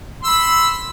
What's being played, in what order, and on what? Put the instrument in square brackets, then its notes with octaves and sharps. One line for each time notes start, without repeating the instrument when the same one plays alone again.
[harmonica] C6
E6
B5